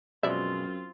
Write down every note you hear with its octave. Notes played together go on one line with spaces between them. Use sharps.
F#2 B2 F3 G#3 C4 F4 D5 E5